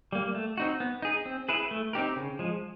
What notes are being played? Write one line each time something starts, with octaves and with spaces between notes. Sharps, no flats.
G3 A#3
A3
C4 D#4 F#4
B3
D#4 G#4
C4
E4 G#4 B4
A3
C4 D#4 G4 A#4
C#3
F3 G#3